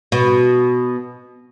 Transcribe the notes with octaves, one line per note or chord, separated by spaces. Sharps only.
B2